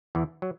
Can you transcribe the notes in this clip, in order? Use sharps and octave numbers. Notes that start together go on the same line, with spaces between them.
E2 E3
F#3